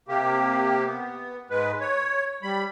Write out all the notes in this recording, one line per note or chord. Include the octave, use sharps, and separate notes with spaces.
C3 A#3 G4
B3
G#2 G#3 B4
C#5
G3 B5